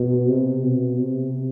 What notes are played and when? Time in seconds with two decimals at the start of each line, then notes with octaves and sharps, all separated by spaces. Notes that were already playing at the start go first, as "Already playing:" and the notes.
Already playing: B2
0.27 C3
0.63 B2
0.99 C3